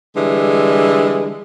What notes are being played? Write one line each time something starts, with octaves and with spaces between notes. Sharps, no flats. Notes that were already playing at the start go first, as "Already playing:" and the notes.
D3 E3 G3 G#3